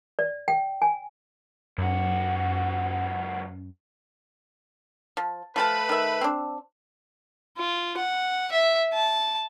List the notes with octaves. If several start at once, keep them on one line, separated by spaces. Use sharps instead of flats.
D5
G5
G#5
C#2 F#2 F#4
F3
F3 A3 F4 B4 A5
D#3 E5
C4 D4
F4
F#5
E5
A5